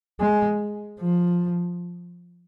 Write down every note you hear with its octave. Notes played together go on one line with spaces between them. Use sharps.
G#3
F3